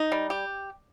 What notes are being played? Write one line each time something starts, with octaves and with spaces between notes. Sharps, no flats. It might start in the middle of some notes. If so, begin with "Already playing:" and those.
Already playing: D#4
G3
G4